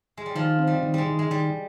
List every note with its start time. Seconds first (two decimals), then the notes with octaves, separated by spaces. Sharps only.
0.17 G#3
0.26 G3
0.35 D#3 F3
0.59 C4
0.67 G3
0.83 D#3
0.94 G3 G#3
1.07 D#3
1.19 G#3
1.30 D#3 G3